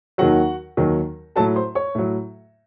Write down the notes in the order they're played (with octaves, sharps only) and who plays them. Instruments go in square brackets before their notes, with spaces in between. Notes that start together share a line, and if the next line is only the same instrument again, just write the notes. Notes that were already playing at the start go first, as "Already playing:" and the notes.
[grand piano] D#2 D#3 F#3 F#4 F#5
D#2 D#3 F#3
A2 F#3 A4 A5
C5 C6
C#5 C#6
A2 F#3